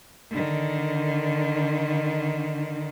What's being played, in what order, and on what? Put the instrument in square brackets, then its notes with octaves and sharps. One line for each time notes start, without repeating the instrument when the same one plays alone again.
[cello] D3 D#3